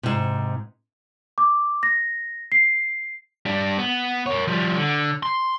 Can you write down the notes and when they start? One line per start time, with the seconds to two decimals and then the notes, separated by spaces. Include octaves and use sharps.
0.03 G#2 C3
1.38 D6
1.83 A#6
2.52 C7
3.46 G3 D4
3.79 B3
4.26 A#4 C#5
4.48 F3 G3
4.77 D3
5.23 C6